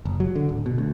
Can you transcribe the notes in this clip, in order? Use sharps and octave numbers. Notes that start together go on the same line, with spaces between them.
F#1
F#3
D3
D1
B2
D2